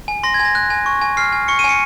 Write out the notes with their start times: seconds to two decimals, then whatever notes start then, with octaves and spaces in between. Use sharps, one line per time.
0.08 G#5
0.23 C6 A#6
0.34 G#6
0.40 G#5
0.45 A#6
0.55 F#6
0.70 G#5
0.86 C#6
1.01 G#5
1.17 F6 C7
1.33 G#5
1.48 C#6 C#7
1.59 D#7
1.64 G#5 C#7